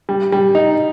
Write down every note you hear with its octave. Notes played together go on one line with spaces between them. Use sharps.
G3
G3
D#4